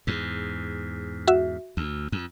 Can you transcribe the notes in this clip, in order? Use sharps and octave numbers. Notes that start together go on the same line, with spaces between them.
E2 G#2
F#4 E5
D2
F2